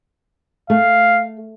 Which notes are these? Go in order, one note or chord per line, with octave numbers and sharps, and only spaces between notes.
A3 F5